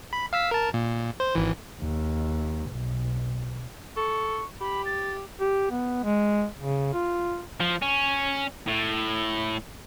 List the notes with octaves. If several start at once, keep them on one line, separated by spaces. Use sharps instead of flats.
B5
F5 E6 B6
A#4 A5
A#2
C5
G#1 E3
D#2
B1
A4 C#6
G4 B5
A6
G4
B3
G#3
C#3
F4
F3
C#4
A2